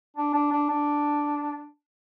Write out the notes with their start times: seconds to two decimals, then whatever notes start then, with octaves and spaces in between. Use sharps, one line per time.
0.17 D4
0.34 D4
0.52 D4
0.69 D4